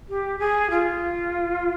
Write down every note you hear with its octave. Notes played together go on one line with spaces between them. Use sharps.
G4
G#4
F4